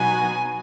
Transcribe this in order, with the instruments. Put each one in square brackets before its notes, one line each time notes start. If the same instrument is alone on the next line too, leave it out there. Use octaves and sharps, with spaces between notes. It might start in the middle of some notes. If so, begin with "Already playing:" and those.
Already playing: [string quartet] B2 F#3 B3 D#4 F#4 [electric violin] G#5